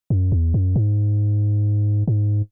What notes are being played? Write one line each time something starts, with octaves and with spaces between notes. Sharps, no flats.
F#2
E2
F#2
G#2
G#2